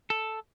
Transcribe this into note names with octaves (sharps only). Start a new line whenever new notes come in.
A4